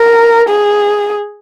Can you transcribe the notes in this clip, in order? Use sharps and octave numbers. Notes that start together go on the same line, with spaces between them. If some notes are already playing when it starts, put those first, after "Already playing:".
Already playing: A#4
G#4